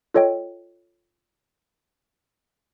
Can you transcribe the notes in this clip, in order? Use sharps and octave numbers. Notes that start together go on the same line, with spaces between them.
F4 A4 C#5 D#5 G5